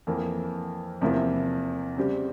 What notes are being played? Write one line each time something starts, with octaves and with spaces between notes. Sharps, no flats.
F2 E3 A#3
E2 C3 F3 A#3 E4
C#3 G3 C4 G4